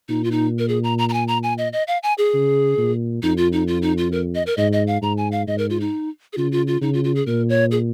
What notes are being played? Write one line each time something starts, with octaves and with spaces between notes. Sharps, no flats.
A#2 D#4
F4
D#4
A#4
G#4
A#5
A#5
A#5
G#5
A#5
G#5
D#5
D#5
F5
G#5
G#4
C#3
A#2
F2 D#4
F4
D#4
F4
D#4
F4
A#4
D#5
A#4
G#2 D#5
D#5
F5
G#2 A#5
G#5
F5
G#2 D#5
A#4
F4
D#4
G#4
C#3 F4
F4
F4
C#3 D#4
F4
F4
G#4
A#2 A#4
C#5
G#4